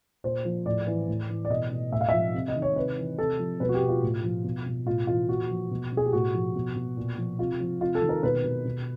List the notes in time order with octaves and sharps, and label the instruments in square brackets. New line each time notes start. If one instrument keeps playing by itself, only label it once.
[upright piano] A#2 C5
F3
A2 D5
E3
A2
E3
D5
B2 D#5
B2
A2 E5
F5
F3 E5
C3
D#5
D#3
C#5
C3 B4
E3
C3 A4
F3
B2 B4
F#4
G4
B2
F4
A2
F3
B2
B2
A2 F4
E3 F4
A#2 F#4
F3
B2
B2
G#4
G4
A2 F#4
F3
B2
B2
A#2
F3
C3 F4
F3
C3 F4
A4
D#3
A#4
B2 B4
B2
B2